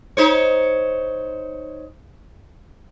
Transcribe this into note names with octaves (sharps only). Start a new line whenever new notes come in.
D#4 C5 C#5